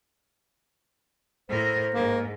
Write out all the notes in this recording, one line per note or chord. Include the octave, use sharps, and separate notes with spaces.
A2 A#4 C5
G#2 A#3